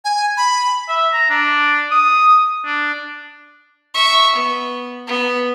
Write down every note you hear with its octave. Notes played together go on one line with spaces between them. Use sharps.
G#5
B5
E5
A#5
D4
D#6
D4
E5 C#6
B3
B3